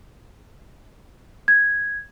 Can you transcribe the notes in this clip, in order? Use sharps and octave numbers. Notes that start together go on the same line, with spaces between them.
G#6